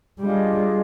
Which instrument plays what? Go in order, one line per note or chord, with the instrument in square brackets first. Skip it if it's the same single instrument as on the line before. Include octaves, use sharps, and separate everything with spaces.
[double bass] G3 [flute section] D4 F4 G#4 D#5